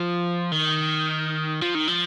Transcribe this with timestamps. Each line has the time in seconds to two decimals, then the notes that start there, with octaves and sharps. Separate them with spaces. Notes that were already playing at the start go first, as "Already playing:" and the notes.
Already playing: F3
0.52 D#3
1.62 F3
1.75 D#3
1.88 F3